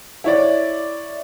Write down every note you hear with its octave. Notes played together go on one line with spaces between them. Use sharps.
E4 C#5 D5